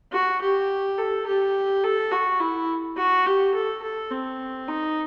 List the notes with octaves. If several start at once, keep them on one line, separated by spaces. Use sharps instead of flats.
F#4
G4
A4
G4
A4
F#4
E4
F#4
G4
A4
A4
C4
D#4